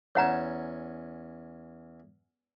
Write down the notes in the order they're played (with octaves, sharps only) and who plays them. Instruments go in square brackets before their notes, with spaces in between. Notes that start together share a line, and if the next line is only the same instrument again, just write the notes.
[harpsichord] E2 C#4 [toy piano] C#5 F#5 A#5